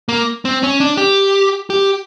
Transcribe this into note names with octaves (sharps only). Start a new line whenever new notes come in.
A#3
C4
C#4
D4
G4
G4